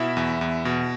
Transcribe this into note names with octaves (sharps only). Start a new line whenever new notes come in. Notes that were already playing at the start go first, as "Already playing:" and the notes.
Already playing: B2 E4 E5
E2
E2
B2